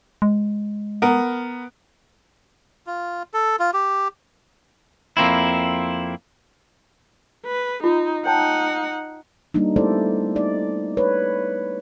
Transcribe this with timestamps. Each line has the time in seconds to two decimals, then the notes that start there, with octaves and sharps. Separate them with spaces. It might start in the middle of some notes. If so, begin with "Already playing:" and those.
0.22 G#3
1.02 B3 A#4
2.87 F4
3.34 A4
3.59 F4
3.74 G4
5.17 F2 A#3 C4 E4
7.46 B4
7.84 D#4 F4
8.26 D#4 C#5 F#5 G5 A5
9.54 G3 A#3 D4 D#4
9.76 A3 B3 E4 A4 C5 D5
10.36 D#4 D5
10.97 B4 C#5